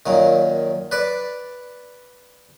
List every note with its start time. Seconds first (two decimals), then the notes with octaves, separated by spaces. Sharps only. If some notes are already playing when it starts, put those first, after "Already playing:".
0.06 F#2 A#2 D#3
0.92 B4 D5